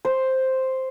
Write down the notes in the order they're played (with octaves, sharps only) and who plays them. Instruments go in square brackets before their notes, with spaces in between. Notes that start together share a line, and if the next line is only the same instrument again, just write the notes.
[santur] C5